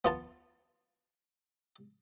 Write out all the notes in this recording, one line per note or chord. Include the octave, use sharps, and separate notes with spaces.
B3 F4 A5